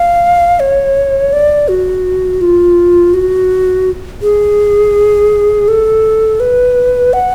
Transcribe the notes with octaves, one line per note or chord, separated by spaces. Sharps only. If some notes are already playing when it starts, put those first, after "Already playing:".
Already playing: F5
C#5
D5
F#4
F4
F#4
G#4
A4
B4
F#5